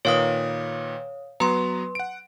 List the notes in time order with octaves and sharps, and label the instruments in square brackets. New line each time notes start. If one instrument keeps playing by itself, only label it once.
[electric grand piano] A#2 D#3 B4 [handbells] C#5 F5 D#6
[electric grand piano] F#3 B3 A#5 [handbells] B4 C6
[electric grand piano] F#5 D7